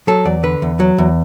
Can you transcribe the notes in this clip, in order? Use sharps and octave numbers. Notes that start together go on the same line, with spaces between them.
F#3 A4
E2 D5
D3 B4
E2
F#3
E2